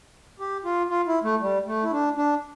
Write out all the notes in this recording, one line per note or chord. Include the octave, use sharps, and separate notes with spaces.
G4
F4
F4
E4
A3
G3
A3
E4
D4
D4